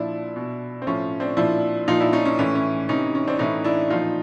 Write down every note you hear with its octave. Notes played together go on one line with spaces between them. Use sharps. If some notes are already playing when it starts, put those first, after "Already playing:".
Already playing: A#2 F3 D4 E4
B2
C4
A2 F3 C#4
C4 D4
A#2 F3 D4 E4
A#2 F3 D#4 F4
D4 E4
C#4 D#4
C#4
A2 E3 C#4
C#4
C3 E3 C#4 D#4
C#4
C4 D4
A2 E3 C#4 D#4
D4 E4
A#2 F3 D#4 F4